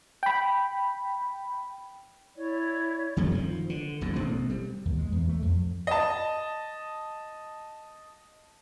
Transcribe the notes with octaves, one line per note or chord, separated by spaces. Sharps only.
G5 B5
E4 C#5 D5
F#2 C3 F#3 A3
D#3 F3
D3
F#1 D#2 G#2
A1 B2 A3 C4
G3
D#2
G#3
E2
A3
F2
D#5 A5